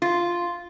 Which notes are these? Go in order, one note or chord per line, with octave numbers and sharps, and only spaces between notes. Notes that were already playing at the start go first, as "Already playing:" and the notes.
F4